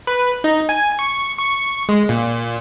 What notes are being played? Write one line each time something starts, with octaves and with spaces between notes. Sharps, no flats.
B4
D#4
G#5
C#6
C#6
G#3
A#2